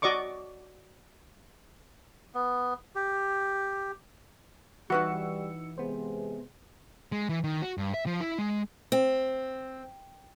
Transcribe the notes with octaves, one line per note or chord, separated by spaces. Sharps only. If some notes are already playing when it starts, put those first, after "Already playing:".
F#4 D5 D#5 C#6 D6
B3
G4
E3 G3 D#4 F#4 B4 F#5 E6 C#7
C3 G#3 B3 C5
G#3
E3
D#3
F#4
G2
E5
F3
E4
G#3
C4